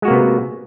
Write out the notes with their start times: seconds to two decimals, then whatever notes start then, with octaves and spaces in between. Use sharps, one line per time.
0.02 G#3
0.05 F#4
0.08 A#3
0.10 C3
0.13 B3